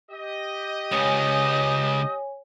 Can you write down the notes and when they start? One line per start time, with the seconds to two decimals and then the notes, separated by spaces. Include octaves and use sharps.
0.12 G4 D#5
0.92 C#2 C#3 C#5 G#5 D#6